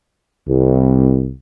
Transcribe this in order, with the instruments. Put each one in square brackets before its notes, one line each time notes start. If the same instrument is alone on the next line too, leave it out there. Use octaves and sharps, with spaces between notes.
[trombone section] C2